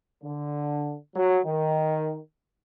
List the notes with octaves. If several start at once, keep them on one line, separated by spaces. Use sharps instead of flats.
D3
F#3
D#3